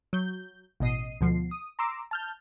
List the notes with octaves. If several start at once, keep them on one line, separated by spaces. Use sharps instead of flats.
F#3 G6
A1 B2 D#5 C7 D#7
D2 B2 F3 C7
D#6
A#5 C6 D6 E6
A5 F6 G6